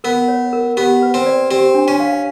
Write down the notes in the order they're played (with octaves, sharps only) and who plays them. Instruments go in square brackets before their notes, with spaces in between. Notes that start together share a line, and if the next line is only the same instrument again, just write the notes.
[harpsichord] B3 [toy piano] A#4
[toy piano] C#5
A#4
[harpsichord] B3 [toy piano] G4
[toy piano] B4
[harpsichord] C4
[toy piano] D5
[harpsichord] C4 [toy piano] G4
[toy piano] D4
[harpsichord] C#4
[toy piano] F5